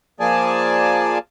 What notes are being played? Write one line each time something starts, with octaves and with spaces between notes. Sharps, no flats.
F3 A#3 G#4 D5 G#5 A5